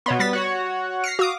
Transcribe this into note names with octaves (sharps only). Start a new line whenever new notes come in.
B2 B3 C#5 C6
G3 A6 B6
F#4 C#5 F#5
F6 A#6 C7 C#7
F#4 F5 D6 D#6